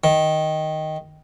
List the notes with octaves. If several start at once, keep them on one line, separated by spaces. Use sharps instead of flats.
D#3